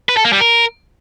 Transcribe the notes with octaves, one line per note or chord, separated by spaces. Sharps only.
B4
A4
A#3
G3
A#4